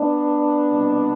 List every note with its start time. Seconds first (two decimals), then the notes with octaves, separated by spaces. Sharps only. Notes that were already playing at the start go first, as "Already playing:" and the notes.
Already playing: B3 D4
0.69 C2 B2